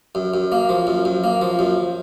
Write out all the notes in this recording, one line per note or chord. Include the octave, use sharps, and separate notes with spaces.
F#2
F#2
A#3
F3
F#2
F#2
A#3
F3
F#2